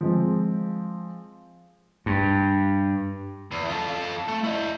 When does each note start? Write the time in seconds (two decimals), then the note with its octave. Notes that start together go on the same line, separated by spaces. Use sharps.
0.01 F3 G#3 C4
2.06 G2
3.51 E2
3.69 F4 A4
4.28 A3
4.44 E4 D#5